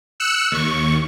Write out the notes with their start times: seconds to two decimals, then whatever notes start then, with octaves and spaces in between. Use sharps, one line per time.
0.20 E6 F#6 C#7 E7
0.51 D#2 C#6